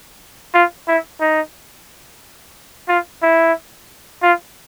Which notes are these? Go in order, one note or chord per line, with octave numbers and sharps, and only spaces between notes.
F4
E4
D#4
F4
E4
F4